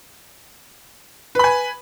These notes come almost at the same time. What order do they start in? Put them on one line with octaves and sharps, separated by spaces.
B4 B5 G#5